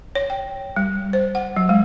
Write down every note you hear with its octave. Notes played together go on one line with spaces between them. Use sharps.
C#5
G5
G3
C5
F#5
F#3
G#3